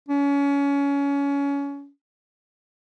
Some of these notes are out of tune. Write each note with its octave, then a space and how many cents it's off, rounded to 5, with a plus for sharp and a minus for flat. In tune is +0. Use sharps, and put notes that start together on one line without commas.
C#4 +25